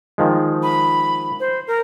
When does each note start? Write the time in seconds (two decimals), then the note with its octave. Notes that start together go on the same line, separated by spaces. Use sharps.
0.18 D#3 F3 G#3
0.63 B5
1.40 C5
1.67 A#4